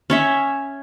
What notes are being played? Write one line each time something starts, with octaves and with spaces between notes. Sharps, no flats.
C#4 C#5 E5